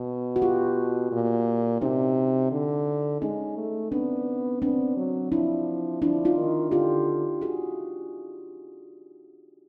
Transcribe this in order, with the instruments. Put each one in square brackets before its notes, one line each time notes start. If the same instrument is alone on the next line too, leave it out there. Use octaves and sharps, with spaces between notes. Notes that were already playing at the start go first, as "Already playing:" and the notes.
Already playing: [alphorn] B2
[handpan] F#4
F4 G4
[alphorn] A#2
[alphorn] C3 [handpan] C#4 D#4
[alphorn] D3
[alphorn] G#3 [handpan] C#4 D#4
[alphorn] A3
[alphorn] B3 [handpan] C4 D4
[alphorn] B3 [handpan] C4 D4
[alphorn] F#3
[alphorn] F3 [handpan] D4 E4
[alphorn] F3 [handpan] D4 E4
[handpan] D#4 F4
[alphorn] D#3
[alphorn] D3 [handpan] F4 G4
[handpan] F#4 G#4